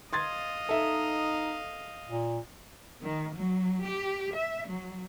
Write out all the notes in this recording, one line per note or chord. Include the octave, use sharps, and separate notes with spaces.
D#5 F5 C6 G#6 A6
D#4 A4 E5
A#2
D#3
F#3
G4
E5
F#3